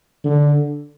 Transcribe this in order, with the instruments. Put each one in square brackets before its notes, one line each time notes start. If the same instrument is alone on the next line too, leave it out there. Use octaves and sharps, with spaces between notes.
[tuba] D3